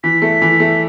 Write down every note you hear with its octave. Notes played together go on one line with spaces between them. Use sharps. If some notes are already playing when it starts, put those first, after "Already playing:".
E3 B6
A3
E3
A3